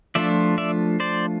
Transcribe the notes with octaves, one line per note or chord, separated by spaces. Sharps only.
F3 A3 D4 F4 D5 E5
D5 E5
C5 D5